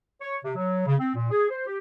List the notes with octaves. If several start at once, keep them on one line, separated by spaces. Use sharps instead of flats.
C#5
C3
F#3
C#3
C4
A#2
G#4
C5
G4